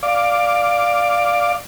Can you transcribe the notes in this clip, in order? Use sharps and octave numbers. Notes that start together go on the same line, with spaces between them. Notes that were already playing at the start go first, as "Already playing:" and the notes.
D5 F5 D6